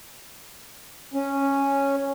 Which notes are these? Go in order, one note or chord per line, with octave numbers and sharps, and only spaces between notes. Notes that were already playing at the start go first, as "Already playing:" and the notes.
C#4